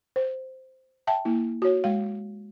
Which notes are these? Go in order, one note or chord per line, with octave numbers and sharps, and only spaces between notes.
C5
E5 G5 A5
A#3 E4
F#4 C#5
G#3 F5